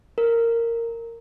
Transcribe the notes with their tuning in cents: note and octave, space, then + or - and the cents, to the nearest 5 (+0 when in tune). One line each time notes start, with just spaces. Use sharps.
A#4 -10